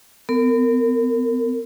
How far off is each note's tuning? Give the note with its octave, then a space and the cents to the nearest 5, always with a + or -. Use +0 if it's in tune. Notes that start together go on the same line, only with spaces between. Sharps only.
B3 +30 A#4 -30